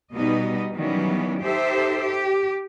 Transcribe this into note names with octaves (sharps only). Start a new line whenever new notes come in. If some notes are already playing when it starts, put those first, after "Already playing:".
B2 G3 B3 D#4 D#5
D#3 E3 F#3 G3 B3 C#4
D#4 G4 A4 C5 E5
G4